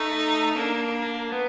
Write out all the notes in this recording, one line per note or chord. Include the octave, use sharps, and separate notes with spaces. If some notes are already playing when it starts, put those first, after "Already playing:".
Already playing: A3 D#4
A#3 D4
B3